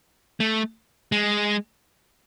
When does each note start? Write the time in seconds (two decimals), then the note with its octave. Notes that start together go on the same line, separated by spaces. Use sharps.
0.40 A3
1.12 G#3